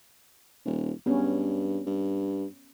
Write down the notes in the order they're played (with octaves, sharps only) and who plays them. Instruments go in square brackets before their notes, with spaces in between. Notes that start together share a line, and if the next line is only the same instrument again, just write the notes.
[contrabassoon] D#1
[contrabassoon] G2 [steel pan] B3 C#4
[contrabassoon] G2